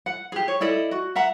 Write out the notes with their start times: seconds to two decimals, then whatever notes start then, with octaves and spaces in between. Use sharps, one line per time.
0.06 F#5
0.32 G4 G#4
0.48 C#5
0.61 E4 A4 D5 D#5
0.91 F#4
1.16 E5 F#5 A#5